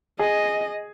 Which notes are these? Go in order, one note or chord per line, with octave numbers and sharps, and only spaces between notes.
G#4 D#5